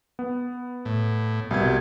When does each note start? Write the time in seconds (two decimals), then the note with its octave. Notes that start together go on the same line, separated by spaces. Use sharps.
0.19 B3
0.85 A2
1.51 C2 B2 G3 G#6